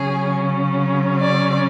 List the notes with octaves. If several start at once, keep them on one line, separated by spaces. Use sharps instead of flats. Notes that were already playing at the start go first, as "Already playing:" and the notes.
Already playing: C#3 F#3 C#4 G#4
D5